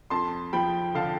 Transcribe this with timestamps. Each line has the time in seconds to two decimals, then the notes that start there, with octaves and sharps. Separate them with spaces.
0.10 F2 A5 C6
0.53 F3 G5 B5
0.95 D3 F5 A5